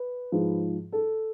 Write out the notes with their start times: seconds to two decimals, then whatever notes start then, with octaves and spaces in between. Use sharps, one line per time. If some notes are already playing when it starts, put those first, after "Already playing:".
Already playing: B4
0.32 G#2 F3
0.92 A4